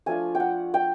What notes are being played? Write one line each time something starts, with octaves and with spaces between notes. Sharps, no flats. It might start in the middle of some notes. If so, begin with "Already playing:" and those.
F3 A3 D4 F4 G#5
G5
F#5
G5